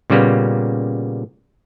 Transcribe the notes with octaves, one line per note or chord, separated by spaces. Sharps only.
A#2 C#3 G3 A#3 B3